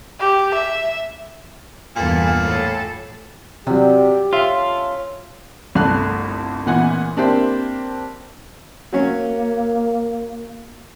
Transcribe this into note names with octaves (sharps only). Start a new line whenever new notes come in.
G4
E5
E2 G2 A#2 A4
A2 A4
C3 F#3 G3 G4
C#4 F4 A4 E5
G1 C2 A3 A5 F#6
A1 A#2 E3 B3 F#5 G#5
A#3 C4 D4 E4 G4 C5
F#3 A#3 C#4